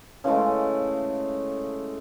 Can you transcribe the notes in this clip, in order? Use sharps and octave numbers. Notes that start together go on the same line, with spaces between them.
C#3 E3 G#3 A3